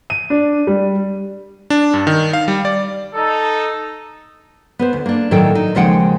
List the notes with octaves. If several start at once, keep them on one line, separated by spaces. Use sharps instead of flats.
D#7
D4
G3
D4
G2
D#3
F5
G3
D5
D#4 A4
B3 B4 C5
D2
A#3 D4
A2 D#3 F#3 A4 G5
D#4
D#2 C#3 F3 G#3 F#5 G5